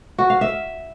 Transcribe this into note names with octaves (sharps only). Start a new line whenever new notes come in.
F#4
F5
E5